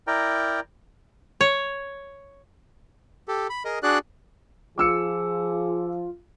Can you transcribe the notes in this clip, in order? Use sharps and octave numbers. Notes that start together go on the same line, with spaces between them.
E4 A#4 D5 G5 A#5
C#5
G4 A4
B5
G#4 A#4 D#5
D4 F#4 G#4 D5 F#6
F3 F4 G#4 D6 E6 C#7